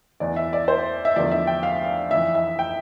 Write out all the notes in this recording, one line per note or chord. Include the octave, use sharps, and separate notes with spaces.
E2 E3 D5
E5
D5
C5
E5
E2 D3 F3 D5
E5
G5
F5
F2 E3 E5
E5
G5